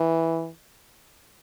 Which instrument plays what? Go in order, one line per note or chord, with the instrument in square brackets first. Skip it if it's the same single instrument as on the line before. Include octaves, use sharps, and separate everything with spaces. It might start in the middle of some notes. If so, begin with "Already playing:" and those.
Already playing: [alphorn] E3